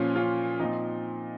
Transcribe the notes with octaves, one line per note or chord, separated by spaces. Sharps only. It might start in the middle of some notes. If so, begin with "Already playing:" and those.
Already playing: A#2 F3 C#4 F4
C#4 F4
A#2 F3 C4 D#4